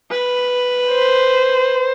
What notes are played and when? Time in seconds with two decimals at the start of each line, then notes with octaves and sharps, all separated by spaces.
0.10 B4
0.92 C5